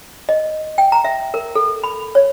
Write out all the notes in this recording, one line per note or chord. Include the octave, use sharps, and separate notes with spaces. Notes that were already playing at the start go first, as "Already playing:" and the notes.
D#5
G5
A#5
E5
A#4
A4
B5
C#5